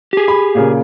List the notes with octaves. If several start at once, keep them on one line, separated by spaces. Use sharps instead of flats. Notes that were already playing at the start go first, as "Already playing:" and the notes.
G4 G#4
B5
A#2 C#3 A#3